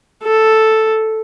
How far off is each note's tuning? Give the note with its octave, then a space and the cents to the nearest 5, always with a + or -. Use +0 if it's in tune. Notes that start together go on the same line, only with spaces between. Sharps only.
A4 +0